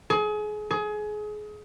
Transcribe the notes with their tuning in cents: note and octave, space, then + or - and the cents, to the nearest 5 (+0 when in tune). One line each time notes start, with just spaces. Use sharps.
G#4 +30
G#4 +25